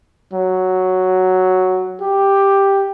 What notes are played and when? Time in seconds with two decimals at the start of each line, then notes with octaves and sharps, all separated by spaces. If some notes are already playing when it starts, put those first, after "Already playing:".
0.33 F#3
2.01 G4